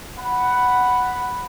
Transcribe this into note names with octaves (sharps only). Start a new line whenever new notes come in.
F#5 B5